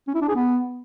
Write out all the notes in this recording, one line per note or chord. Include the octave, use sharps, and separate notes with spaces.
C#4
E4
D4
G#4
B3